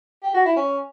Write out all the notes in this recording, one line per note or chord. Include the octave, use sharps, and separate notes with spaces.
G4
F#4
E4
C#4